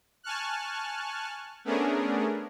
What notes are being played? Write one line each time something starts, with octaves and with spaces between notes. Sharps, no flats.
G#5 A5 C#6 F6 F#6
A3 B3 C#4 D4 G#4 A#4